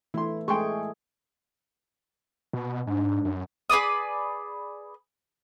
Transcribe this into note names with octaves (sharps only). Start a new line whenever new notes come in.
E3 A3 E4 C6
G#3 A3 G#4 G5 C6 C#6
B2
G#2 D4
F#2
G#4 B4 D5 D#6